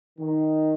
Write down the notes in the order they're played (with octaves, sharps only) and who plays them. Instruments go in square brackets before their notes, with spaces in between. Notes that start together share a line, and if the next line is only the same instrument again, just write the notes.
[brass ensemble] D#3